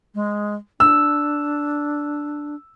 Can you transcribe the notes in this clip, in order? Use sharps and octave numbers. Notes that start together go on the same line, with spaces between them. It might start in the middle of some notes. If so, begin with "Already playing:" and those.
G#3
D4 E6